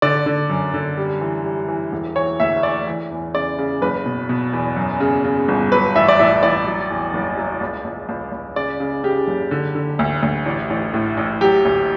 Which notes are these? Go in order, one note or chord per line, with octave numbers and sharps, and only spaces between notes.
D3 D5
D3
F#2
D3
G3
E3
G3
E3
E1
E3 C#5
D2 E5
E3 D5
E3
E2
C#3 D5
C#3
F#1 B4
B2
B2
E2
F#2
C#3
C#3
G1
F#3 B4
A1 E5
D5
A1 E5
A1 D5
F#3
E2
F#1
F#3
C#2
C#2
C#2
C#2
C#3 D5
C#3
C#3 G4
F#1
D3
D3
D2
D2
A1
A1
A2
A1
F#3 G4
D2